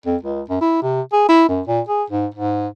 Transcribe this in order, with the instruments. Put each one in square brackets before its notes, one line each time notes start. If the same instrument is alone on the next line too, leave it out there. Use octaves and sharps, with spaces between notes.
[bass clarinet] F2
C#2
F#2
E4
C3
G#4
E4
F#2
A#2
G#4
G#2
G#2